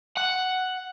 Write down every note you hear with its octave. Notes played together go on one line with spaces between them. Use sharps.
F#5